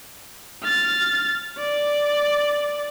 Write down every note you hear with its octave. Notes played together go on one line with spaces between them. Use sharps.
F6 A6
D5